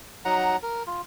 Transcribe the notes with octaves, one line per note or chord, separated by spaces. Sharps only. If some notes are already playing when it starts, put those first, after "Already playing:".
F#3 D#4 F#5 A#5
A#4
F4